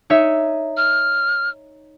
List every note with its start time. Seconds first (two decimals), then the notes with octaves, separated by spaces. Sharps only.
0.10 D#4 C#5 E5
0.77 F6